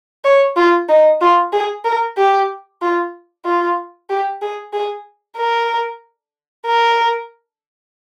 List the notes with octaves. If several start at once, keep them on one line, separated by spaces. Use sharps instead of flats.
C#5
F4
D#4
F4
G#4
A#4
G4
F4
F4
G4
G#4
G#4
A#4
A#4